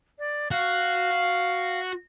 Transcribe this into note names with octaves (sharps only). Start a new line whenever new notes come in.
D5
F#4 F5